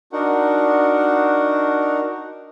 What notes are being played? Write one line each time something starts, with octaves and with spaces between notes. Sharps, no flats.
D4 D#4 F#4 A#4 F#5